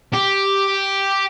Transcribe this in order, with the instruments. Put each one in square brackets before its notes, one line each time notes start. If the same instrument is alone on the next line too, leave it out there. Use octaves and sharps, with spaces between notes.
[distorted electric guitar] G4